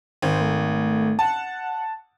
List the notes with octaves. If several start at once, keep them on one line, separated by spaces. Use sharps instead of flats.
G#1 C5
A3
F#5 A5